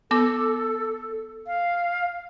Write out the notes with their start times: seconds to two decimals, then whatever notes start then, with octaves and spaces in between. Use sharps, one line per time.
0.11 B3 A4 D6
1.47 F5